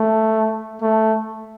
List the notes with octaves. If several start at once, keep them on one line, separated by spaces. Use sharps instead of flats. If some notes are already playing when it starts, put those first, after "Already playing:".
Already playing: A3
A3